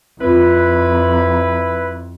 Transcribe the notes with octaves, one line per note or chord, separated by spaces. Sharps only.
F2 C4 E4 F4 B4